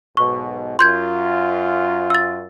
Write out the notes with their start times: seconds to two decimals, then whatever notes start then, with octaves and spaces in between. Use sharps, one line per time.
0.17 B1 G#2 B2 C#6
0.79 F#2 F4 C6 G6 G#6
2.10 E6 A6